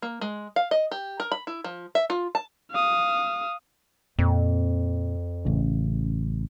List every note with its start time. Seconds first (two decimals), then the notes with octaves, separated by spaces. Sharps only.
0.02 A#3
0.21 G#3
0.56 F5
0.71 D#5
0.91 G4
1.20 A#4
1.32 B5
1.47 E4
1.64 F3
1.95 E5
2.10 F4
2.35 A5
2.71 F5 D#6
4.19 F2 A#2 C4
5.45 A1 C#3